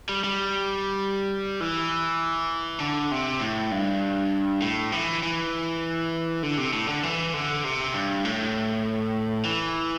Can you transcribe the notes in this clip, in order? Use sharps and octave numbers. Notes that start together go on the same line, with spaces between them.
G3
G3
E3
D3
C3
A2
G2
A2
E3
E3
D3
C3
A2
D3
E3
D3
C3
G2
A2
E3